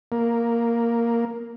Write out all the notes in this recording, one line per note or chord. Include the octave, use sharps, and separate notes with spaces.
A#3